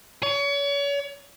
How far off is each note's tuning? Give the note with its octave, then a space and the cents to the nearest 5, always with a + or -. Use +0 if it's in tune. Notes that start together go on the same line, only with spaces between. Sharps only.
C#5 +35